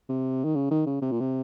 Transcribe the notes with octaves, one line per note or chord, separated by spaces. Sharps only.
C3
D#3
C#3
D#3
C#3
C3
A#2
C3